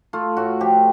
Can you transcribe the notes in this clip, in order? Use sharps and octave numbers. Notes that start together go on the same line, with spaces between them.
A3 F4
A2 F#4
F3 G4